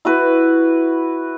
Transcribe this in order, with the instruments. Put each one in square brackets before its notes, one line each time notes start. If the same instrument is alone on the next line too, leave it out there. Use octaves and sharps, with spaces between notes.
[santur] E4 F#4 B4